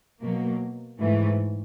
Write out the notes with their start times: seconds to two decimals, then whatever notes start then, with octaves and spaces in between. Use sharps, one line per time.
0.21 B2 F#3 A#3
0.97 G#2 E3 A3